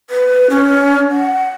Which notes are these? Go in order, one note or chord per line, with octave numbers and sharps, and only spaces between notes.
B4
C#4
F#5